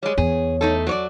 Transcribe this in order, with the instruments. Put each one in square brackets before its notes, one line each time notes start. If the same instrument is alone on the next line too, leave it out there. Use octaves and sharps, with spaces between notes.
[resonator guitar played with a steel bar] G3 G#3 [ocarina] C#5
[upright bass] E2 [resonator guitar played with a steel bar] G#4
[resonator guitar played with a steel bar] A3 D#4 A4
F#3 C#5 D5